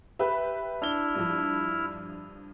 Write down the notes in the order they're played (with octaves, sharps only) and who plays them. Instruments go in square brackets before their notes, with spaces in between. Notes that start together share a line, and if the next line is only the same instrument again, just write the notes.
[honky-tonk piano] G4 B4 [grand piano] E5
[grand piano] D4 G7 [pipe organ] E4 F6
[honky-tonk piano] G2 F3